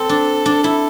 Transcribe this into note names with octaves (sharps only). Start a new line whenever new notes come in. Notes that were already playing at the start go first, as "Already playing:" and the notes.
Already playing: C4 A4
D4
D4
E4 A4